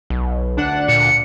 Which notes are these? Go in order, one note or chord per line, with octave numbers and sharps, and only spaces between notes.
B1
D2 D4 F#5
A#2 C#7